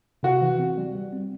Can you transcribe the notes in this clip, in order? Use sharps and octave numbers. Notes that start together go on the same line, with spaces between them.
C3 F#4
E3
C4
G3
G3
C4